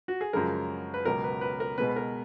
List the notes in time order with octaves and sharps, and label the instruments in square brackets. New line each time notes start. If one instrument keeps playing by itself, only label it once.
[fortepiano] F#4
G#4
F#2 C#3 F3 G#3 A#4
B4
C#2 B2 F#3 A#4
B4
B4
A#4
B2 G#3 B3 B4
B4
A#4